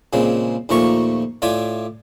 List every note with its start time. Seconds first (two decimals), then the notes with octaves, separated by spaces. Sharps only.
0.13 A#2 C#3 G#3 C4
0.69 D#2 A#2 F3 A3 A#5 C#6
1.42 A2 F4 D5 E5 G#5